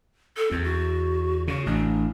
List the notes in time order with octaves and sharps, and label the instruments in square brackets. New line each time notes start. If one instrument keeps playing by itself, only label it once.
[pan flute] A4
[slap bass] E2 [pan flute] C4
[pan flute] F#4
[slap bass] C#3 [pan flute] F#4
[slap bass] A1 [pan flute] D4